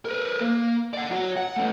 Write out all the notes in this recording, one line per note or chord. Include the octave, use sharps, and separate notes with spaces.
A#4 B4
A#3
D5 F#5
F#4 C#5
F#5
A3 C#4